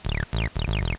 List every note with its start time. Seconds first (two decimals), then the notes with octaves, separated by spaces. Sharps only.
0.05 D1
0.33 A1
0.56 D#1
0.68 G#1
0.82 E1